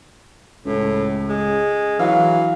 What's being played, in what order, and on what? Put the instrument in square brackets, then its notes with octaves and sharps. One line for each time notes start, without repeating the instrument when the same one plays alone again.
[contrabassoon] C#2 [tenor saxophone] A2
[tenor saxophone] G#3
[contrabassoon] E3 [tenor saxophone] F#3 [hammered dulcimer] F5